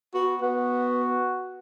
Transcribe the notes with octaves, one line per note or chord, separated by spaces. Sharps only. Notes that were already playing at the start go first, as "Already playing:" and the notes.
B3 F#4
B3 F#4